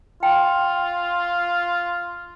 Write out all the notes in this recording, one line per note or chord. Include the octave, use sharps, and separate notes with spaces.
F4 G5